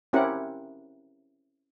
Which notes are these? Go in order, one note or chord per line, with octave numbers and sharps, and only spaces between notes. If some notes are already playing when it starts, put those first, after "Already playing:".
C4 C#4 E4 G4 A#4 F#5